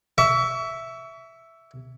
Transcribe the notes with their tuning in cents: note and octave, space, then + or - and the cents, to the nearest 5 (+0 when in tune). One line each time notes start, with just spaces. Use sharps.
E5 +0 C#6 +35